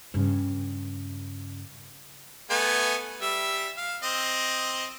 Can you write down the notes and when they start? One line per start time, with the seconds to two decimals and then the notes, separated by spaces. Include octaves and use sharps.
0.14 G2 C#3
2.50 A3 B3 G#5
3.21 G3 E5
3.77 F5
4.03 C4 D#5